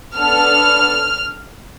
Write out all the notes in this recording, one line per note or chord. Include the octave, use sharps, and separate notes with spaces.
B3 D4 A4 F6